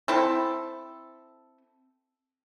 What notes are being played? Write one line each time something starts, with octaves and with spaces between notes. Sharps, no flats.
C4 E4 A4